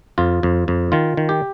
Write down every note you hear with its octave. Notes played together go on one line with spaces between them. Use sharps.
F2 F4
F2
F2
D#3 F4
D#3
G4